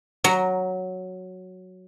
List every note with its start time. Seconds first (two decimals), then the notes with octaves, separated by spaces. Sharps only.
0.24 F#3 A#5